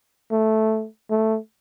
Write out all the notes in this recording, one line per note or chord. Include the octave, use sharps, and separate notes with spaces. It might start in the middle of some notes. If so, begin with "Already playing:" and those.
A3
A3